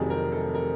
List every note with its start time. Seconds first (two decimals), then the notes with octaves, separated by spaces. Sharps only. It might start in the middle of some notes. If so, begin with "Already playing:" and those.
Already playing: F1 F2 C3 D#3 F#3 G#4
0.10 A#4
0.32 A4
0.55 A#4